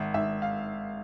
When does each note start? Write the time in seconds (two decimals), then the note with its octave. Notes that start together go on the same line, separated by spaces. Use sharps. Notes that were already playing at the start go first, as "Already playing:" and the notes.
Already playing: G#1 E5
0.14 G#1 E5
0.42 F5